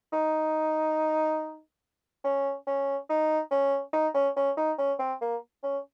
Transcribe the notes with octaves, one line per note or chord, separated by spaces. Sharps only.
D#4
C#4
C#4
D#4
C#4
D#4
C#4
C#4
D#4
C#4
C4
A#3
C#4